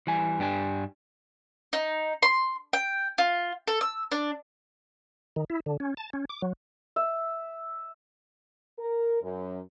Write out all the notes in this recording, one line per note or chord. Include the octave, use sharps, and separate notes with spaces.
E3 G3 G#5
G2 D4 G4 G#4 G#5
D#4
C6
G5
F4
A4
E6
D4
D#3
E4
D3
C#4
A5
C#4
D6
F#3
E5
A#4
F#2